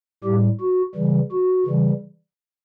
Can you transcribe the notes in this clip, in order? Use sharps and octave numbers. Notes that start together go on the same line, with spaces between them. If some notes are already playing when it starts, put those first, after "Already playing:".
A2 G3 G4
F#4
C#3 E3 G3
F#4
C#3 E3 G3